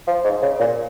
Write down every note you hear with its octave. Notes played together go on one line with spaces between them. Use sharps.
F3
G#2
C#3
A#2